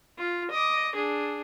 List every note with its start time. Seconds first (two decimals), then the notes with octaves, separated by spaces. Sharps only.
0.18 F4
0.51 D#5 D6
0.95 D4 G#4